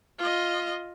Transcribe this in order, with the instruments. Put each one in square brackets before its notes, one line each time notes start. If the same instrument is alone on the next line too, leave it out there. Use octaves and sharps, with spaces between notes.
[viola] F4 D#5